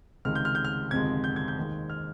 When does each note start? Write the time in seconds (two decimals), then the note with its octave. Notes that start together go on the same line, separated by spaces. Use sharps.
0.25 C#2 C3 D#3 G#3 F6
0.35 G6
0.45 F6
0.55 G6
0.65 F6
0.91 G1 F2 C3 D#3 G#3 G#6
1.24 G6
1.36 G#6
1.48 G6
1.57 D#2 D#3 G#3
1.90 F6